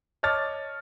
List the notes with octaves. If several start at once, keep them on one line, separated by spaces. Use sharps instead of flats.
C#5 D#5 A5 D6 F6 A6